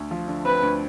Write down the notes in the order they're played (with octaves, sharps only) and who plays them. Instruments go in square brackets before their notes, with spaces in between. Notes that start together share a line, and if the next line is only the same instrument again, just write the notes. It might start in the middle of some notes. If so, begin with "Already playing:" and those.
Already playing: [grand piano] D2
F3
D3
[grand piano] C4 [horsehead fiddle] B4
[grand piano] D2